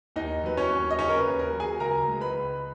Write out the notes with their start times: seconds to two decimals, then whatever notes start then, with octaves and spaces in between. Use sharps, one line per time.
0.16 D#2 D#4 D#5
0.44 F#3 B4
0.57 C#4 C#5
0.71 D#2
0.90 D#5
0.98 C#3 C#4 C#5
1.10 A#4
1.18 B4
1.26 D#2
1.39 A#4
1.53 F#3
1.60 G#4 G#5
1.80 C#2 A#4 A#5
2.07 G#3
2.21 B4 B5
2.35 C#2